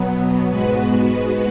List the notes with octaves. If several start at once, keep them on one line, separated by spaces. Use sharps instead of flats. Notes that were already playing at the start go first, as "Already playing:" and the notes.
Already playing: B2 F#3 B3
G#2 G#3 B3 F#4 B4